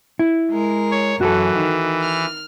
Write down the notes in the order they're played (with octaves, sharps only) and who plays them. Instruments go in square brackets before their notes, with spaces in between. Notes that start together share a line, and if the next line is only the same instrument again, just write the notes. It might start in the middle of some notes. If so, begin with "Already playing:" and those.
[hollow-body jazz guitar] E4
[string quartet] G#3 A#4
[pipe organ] C#5
[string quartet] F#2 [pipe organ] E3 [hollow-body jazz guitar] F#4 A4
[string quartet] D#3
F6